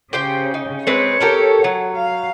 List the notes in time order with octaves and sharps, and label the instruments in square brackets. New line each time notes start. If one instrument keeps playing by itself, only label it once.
[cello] C#3 [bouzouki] G4 C5 G5
[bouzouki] D#4
[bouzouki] G#3 C4 B4 [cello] C#5
[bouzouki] G4 A4 A#4
F#3
[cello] F5